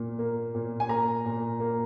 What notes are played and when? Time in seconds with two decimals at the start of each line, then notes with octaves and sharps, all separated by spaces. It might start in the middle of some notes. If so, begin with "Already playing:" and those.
Already playing: A#2 A#3
0.19 A#3
0.55 A#2
0.80 G#5
0.89 A#3 A#5
1.25 A#2
1.60 A#3